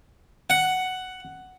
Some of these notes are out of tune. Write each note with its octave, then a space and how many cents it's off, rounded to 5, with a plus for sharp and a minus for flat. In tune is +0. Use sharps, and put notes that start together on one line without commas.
F#5 +5